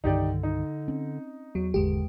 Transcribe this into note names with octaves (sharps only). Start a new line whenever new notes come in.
C2 G2 D3 D#3 D#4 G4 D5
D#4
C4 C#4
E2 F#3
G#1 E2 D3 G#3 G4